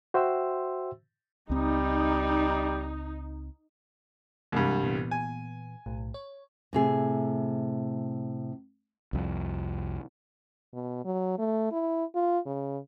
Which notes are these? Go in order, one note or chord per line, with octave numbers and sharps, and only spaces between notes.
F#4 C5 E5 G5 C6 E6
C#2 G3 C4 D#4
C2 G2 E3 G#3
A#2 E3 B3
G#5
B1 A2
C#5
A2 C3 G#4
C2 F2
B2
F#3
A3
E4
F4
C#3